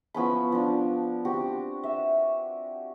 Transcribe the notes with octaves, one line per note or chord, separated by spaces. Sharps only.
F3 B3 C#4 B5
F3 D4
C4 F#4 G4
E5